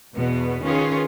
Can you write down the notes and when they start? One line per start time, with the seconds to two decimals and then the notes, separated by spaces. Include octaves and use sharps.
0.16 E2 B2 B3
0.63 D#3 C#4 F4 G#4 B4 C#5